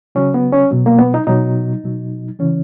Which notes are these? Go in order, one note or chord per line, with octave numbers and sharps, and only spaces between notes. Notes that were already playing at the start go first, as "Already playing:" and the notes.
C#3 F#3 C#4
B3
C#4
B2 F#3
A#3
B3
D#4
B2 F#3 D#4
B2 F#3
C#3 E3 C#4